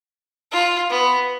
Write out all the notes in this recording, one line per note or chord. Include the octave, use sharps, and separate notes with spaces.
F4
B3